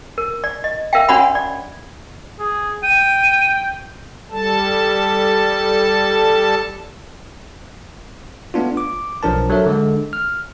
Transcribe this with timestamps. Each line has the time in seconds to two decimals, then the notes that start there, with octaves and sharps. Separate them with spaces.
0.18 A#4
0.44 D5
0.64 D#5
0.93 A#4 E5 F5 G5
1.09 C#4 D4 F#4 C#5 F#5 B5
1.35 D5
2.39 G#4
2.83 G5 D#7
4.31 G3 A4 A5
8.54 A3 B3 D4 F4
8.77 D6
9.23 B1 F3 D4 A#4 A5
9.50 F#3 A4 A#4 E5
9.66 D3 G#3
10.13 F6